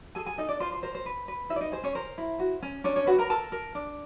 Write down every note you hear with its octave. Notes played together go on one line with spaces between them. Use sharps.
G#4 A4 G#5
G#4 G#5
D#4 A4 D#5
D4 D5
F4 C5
C5
A#4 C5
C5
B4
B4
D#4 E4 E5
D5
D#4 D#5
G#4 C5
C#4 C#5
A#4 C5
E4
F#4
C#4
C#4 D4 C#5
C#4 C#5
F#4 B4 F#5
A#4 A#5
A4 A#4 A5
A#4
D4